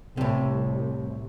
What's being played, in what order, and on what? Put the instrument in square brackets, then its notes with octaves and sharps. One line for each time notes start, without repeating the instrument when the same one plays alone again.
[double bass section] C2 [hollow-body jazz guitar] A2 C3